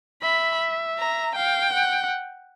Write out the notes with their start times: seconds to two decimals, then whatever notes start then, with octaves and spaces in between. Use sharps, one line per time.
0.22 E5 B5
0.98 A#5
1.35 F5 G5
1.73 F#5